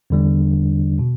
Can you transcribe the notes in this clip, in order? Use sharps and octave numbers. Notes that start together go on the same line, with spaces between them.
E2 D3 G3 D4
B2